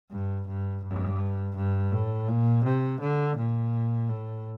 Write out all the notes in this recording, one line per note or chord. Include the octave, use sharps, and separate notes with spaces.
G2
G2
G2
G2
A2
A#2
C3
D3
A#2
A2